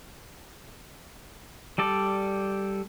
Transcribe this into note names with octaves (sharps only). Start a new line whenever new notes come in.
G3 A4 D5